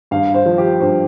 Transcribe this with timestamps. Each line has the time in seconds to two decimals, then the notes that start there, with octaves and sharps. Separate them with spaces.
0.11 G2 F5
0.34 C5
0.45 F3
0.58 G4
0.80 G2 C5